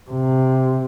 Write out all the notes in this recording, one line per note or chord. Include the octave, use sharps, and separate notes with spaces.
C3